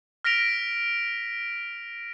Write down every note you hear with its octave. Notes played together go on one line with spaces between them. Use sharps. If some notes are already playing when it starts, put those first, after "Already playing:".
F6 A#6 B6 D7 F7